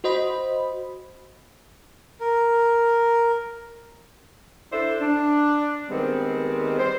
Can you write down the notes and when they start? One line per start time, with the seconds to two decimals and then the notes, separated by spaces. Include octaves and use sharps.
0.04 F#4 C5 D#5 B5
2.21 A#4
4.72 D4 E4 A4 C5 D5 E5
5.01 D4
5.89 D#3 G3 G#3 B3 C4
6.79 C5